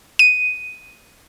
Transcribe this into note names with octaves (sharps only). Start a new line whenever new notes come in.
D#7